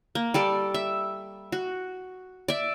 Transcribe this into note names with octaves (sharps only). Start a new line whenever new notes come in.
A#3
G3 A4 D5
E5
F#4
D5 E5